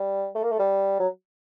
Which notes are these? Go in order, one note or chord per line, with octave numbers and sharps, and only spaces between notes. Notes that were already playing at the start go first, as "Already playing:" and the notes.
Already playing: G3
A3
A#3
A3
G3
F#3